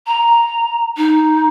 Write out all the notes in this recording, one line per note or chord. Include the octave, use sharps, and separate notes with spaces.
A#5
D#4